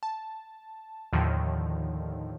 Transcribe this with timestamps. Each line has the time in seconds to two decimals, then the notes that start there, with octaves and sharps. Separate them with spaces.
0.03 A5
1.13 D#2 A2 D3 D#3 F3